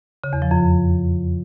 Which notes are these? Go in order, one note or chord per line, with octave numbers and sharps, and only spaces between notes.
C#3
E2
F3
F2